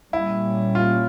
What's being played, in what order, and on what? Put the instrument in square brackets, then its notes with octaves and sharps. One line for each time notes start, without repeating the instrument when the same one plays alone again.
[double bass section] A#2 G3 A#3 C#4 [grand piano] E4
[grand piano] F4